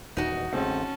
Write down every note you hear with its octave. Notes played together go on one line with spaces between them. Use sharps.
D#1 E2 B2 D#4 F#4
A1 C#3 G#3 A3 C4 C#4 A5